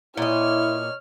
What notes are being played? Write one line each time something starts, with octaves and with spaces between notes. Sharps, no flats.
A#2 E4 C#5 D#5 F6